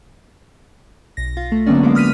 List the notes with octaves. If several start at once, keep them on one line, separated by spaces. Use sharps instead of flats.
B1 A#6
F4
A3
D3 F#3 A#3 B3 C#4 D4
G#3 A#3 B3 D4
D#6 F6 B6 D#7